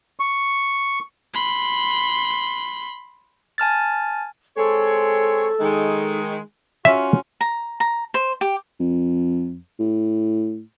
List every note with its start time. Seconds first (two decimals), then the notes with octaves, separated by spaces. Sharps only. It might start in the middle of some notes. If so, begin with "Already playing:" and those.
0.20 C#6
1.34 B5 C6
3.58 G#5 A5 F6 A6
4.57 G#3 C4 A4 C#5
5.60 D#3 G#3
6.85 C#4 F4 F#4 E5
7.41 A#5
7.80 A#5
8.14 C5
8.41 G4
8.80 F2
9.80 A2